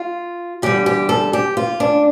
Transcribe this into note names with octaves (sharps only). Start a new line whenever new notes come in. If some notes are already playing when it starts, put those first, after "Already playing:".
Already playing: F4
E2 D3 G3 G4
G4
A4
G4
F4
D4